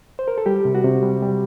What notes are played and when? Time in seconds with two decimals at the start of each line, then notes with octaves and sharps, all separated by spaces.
0.19 C5
0.28 A#4
0.38 A4
0.46 G3 G4
0.65 C3
0.75 F#4
0.84 C3
1.03 G3
1.22 G3